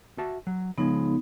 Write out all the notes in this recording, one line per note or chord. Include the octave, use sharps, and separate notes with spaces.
F#4 E5 A5
F#3
C#3 F3 G#3 B3 D#4